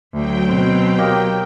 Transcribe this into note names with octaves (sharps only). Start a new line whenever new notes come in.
D2 F#3 G5
B2 C4
A#3 D#4 G4